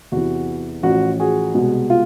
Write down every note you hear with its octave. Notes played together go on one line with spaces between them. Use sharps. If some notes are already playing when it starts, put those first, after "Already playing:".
E2 C3 E3 F#4
A1 A2 F3 F#4
F#4 G#4
C2 B2 G#3
F4